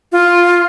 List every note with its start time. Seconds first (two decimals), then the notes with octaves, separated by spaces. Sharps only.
0.12 F4